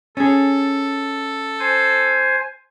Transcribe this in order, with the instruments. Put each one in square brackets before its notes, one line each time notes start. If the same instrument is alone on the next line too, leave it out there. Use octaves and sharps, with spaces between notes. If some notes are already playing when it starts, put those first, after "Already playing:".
[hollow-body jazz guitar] C#4 G#4 [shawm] A4
[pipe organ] C5 G#5